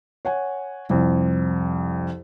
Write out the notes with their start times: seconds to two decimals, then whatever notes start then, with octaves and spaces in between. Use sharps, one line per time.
0.25 C#5 F#5 G#5
0.90 C2 F2